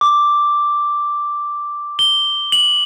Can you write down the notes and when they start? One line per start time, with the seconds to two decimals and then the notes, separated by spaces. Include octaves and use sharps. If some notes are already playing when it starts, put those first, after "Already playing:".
0.01 D6
1.99 G7
2.52 F#7